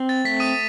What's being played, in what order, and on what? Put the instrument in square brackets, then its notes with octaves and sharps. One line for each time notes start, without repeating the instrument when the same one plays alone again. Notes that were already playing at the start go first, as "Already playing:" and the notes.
Already playing: [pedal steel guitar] C4
[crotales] A6
[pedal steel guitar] A3 [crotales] B6
[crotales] D#6 D#7